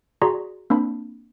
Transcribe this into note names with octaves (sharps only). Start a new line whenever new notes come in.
F#4 G#4 D5 A#5 C6
A#3 C4 D4 B5